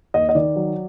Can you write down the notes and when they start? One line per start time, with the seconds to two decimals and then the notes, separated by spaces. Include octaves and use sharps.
0.14 D#2 D#5
0.29 D#5
0.35 D#3 D5
0.56 F#3